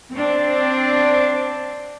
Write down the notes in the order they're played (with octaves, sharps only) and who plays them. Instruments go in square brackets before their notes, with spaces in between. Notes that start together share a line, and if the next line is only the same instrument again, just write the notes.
[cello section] C4 D4